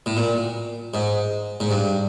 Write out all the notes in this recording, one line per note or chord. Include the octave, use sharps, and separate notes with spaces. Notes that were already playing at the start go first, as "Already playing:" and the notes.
A2
A#2
G#2
G#2
G2